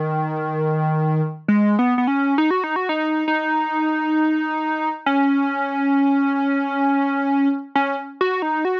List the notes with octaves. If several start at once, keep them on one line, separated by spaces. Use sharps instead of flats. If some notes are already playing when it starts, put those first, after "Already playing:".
Already playing: D#3
G#3
B3
B3
C#4
D#4
F#4
D#4
F#4
D#4
D#4
C#4
C#4
F#4
D#4
F#4